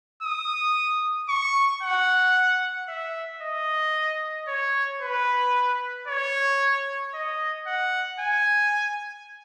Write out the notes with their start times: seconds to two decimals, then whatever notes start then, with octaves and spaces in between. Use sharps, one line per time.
0.23 D#6
1.29 C#6
1.83 F#5
2.89 E5
3.43 D#5
4.48 C#5
5.02 B4
6.08 C#5
7.14 D#5
7.67 F#5
8.20 G#5